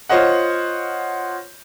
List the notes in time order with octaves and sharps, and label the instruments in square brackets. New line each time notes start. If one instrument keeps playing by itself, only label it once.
[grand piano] F4 C5 C#5 D#5 F#5